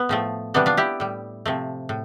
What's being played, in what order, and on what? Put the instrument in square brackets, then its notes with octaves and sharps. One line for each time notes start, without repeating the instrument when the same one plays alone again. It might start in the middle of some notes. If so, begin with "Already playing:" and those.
Already playing: [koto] B3
A2 F3 A3
C3 E3 G3 B3 D4
D4 F4
E4 G4
A2 G3
C3 F3 A3
A2